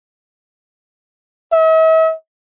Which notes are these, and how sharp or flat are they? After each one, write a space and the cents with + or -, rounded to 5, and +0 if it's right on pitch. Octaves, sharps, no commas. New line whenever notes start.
E5 -45